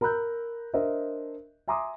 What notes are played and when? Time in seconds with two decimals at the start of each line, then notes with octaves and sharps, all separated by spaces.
0.01 A#4 A#5 B5 E6 F#6 G6
0.74 D4 A#4 C5 D#5 E5
1.68 E5 G#5 A#5 C6 D6 D#6